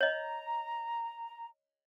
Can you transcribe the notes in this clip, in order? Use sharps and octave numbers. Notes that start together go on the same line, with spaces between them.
C#5 D#5 A#5